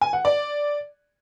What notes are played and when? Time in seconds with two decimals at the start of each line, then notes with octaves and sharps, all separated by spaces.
0.01 G#5
0.13 F#5
0.25 D5